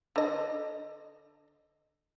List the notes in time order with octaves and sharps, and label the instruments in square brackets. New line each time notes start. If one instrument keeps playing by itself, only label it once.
[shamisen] D3 D#5